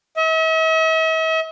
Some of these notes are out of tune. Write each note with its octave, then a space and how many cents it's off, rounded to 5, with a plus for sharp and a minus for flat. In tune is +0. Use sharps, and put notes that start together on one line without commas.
E5 -45